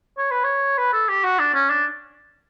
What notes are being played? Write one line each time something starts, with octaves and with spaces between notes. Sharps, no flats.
C#5
B4
C#5
B4
A4
G4
F#4
D4
C#4
D4